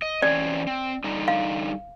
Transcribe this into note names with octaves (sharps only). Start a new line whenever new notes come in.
D#5
E3 C4 C#4 D5
C4
D3 G3 D#4
F5